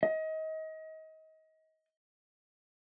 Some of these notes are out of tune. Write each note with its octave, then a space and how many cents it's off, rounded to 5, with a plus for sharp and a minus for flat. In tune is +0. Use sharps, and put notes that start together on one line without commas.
D#5 +30